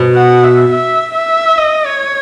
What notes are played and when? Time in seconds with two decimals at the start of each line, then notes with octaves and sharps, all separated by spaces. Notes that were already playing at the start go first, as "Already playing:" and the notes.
Already playing: B2
0.15 F#5
0.44 E5
0.72 E5
1.14 E5
1.58 D#5
1.86 C#5